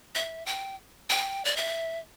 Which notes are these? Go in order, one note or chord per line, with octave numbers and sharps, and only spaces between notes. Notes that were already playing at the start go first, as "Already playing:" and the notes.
E5
G5
G5
D5
E5